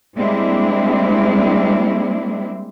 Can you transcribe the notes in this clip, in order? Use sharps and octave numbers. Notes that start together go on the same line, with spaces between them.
G3 G#3 A#3 C4 D4 E4